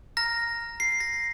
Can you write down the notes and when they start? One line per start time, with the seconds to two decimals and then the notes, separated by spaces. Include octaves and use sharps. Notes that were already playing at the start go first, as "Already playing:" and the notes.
0.17 A#5 F6 A#6
0.80 C7
1.00 A#6